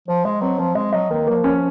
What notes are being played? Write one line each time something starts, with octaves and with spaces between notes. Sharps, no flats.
F3 C5
G#3 D#5
F#3 C4
F3 C4
G#3 D#5
F#3 D#5
D#3 A#3
F#3 A#3
F3
C#4